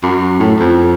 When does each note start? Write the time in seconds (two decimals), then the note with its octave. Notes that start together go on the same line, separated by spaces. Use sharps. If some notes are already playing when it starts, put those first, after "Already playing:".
0.03 F#2
0.39 A2
0.59 F2